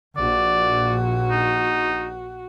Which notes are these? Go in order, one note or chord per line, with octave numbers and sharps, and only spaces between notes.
A#1 F#4 D5
D#4